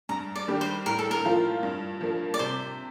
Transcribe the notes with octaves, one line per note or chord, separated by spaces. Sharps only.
G2 A#5
D5
D#3 G3 D4 G4
C5
A2 A#4
A4
A#4
F3 A#3 F4
G2
F3 A#3
D5
C3 C5